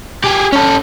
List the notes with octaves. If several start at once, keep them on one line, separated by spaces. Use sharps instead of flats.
G4 G#4
C#4 A4